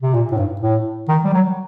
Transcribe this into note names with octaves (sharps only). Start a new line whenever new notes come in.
C3
A#2
A2
G2
A2
D#3
G3
F#3